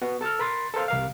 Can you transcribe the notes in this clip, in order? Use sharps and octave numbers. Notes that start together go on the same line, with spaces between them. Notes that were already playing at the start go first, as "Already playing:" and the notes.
B3 F#4
A4 A5 E6 F6
A#4 B5 C6 A6
A4 A#4 C5 F5
C2 A#4 F5